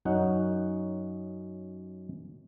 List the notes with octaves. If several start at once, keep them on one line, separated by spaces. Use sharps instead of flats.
F#2 C#4 D#4 F#5